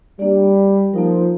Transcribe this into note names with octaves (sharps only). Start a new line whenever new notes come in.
G3 A#3 D4 G4 D5
F3 A#3 D#4 A#4